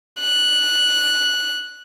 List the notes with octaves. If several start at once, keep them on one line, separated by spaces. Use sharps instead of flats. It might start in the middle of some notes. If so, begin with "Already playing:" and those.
F#6